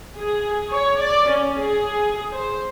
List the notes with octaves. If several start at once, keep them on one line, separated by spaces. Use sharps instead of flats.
G#4
C#5
D5
C#4
G#4
C5